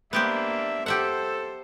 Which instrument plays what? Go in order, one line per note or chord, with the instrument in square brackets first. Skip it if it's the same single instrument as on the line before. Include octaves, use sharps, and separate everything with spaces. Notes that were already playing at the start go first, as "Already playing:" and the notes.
[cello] A#3 D4 [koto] B3 G4 C5 [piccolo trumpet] E5
[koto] G4 E5 F#5 [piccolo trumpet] A4 [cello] C5